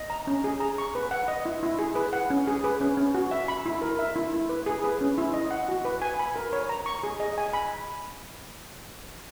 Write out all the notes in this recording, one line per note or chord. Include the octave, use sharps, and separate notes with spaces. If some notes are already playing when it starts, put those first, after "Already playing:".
Already playing: D#5
A#5
C#4
G#4
A#5
C#6
B4
F#5
D#5
E4
E4
G#4
B4
F#5
C#4
G#4
B4
C#4
C#4
F#4
E5
B5
E4
A#4
E5
E4
E4
B4
G#4
B4
C#4
E4
D#5
F#5
F#4
B4
G#5
B5
A#4
C#5
A#5
C#6
G#4
D#5
G#5
B5